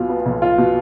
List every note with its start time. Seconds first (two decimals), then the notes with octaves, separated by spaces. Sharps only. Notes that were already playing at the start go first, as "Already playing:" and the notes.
Already playing: B1 B2 F4
0.09 B3
0.26 B1
0.42 F4
0.58 B2